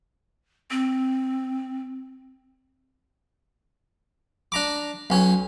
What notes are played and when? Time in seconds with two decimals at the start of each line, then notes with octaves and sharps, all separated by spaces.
0.71 C4
4.52 D4 A#5 D6
5.10 B1 C#4 C#5